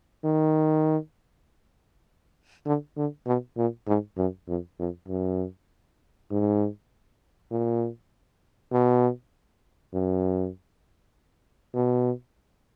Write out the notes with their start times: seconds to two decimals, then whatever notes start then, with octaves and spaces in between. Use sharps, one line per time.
0.25 D#3
2.66 D3
2.97 D3
3.27 B2
3.57 A#2
3.88 G#2
4.18 F#2
4.48 F2
4.79 F2
5.08 F#2
6.31 G#2
7.51 A#2
8.72 B2
9.94 F#2
11.75 B2